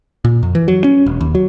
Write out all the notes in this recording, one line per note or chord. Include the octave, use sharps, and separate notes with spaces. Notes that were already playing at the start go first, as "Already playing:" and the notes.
A#2
F2
E3
F#3
C#4
E1
D#2
F#3